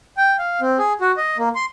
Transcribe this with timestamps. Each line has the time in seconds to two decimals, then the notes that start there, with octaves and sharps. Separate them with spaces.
0.17 G5
0.39 F5
0.61 C4
0.78 G#4
1.01 F#4
1.17 D#5
1.38 A#3
1.55 C6